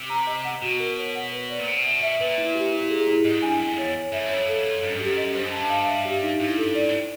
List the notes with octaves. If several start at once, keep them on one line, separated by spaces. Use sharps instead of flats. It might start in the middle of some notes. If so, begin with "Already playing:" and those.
Already playing: C3
A#5
D#5
F#5
B2 F#4
A#4
C#5
F#5
B4
D5
A#2
B2 C5
E5
E5
A#2 B4
E4
G4
E4
G#4
E4
G#2 D#5
G2 G#5
F2 G#5
E2 C#5
C#5
F2 E5
F#2
F2 C#5
A4
A4
F#2 D#5
G2
F#2 G4
D#5
G2 C5
F#2
G2 A5
F5
E5
G4
D#4
G2 E4
A4
D5
A2
C5